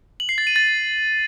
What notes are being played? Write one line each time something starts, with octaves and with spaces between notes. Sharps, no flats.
F#7
C7
A6
D#7
A6